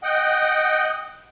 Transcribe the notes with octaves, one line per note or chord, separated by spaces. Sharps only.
D#5 F#5 G5